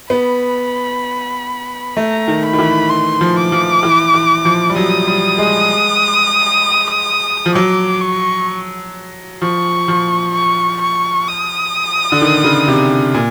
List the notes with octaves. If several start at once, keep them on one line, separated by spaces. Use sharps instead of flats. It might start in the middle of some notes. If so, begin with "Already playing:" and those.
B3 B5
A3 A#5
D#3
B5
D#3
E3
C6
F3
D6
F3
E3
E3
F3
G3
F#3 D#6
G3
G#3
F3
F#3 D6
C#6
F3 C#6
F3
C#6
C#6
D#6
D3
D#3
C#3
C3
A#2